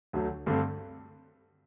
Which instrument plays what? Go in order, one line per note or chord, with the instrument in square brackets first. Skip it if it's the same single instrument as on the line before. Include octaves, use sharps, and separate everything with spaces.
[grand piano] D2 D3 F#3 A3
G2 D3 A3 C4